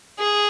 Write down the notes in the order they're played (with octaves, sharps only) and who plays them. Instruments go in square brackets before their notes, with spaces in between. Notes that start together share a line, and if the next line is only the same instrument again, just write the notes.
[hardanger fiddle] G#4